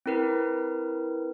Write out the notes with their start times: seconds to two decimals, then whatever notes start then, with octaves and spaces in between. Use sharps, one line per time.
0.06 C4 E4 A#4 B4